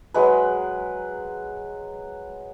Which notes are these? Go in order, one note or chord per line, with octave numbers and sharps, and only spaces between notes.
F#3 G#3 B4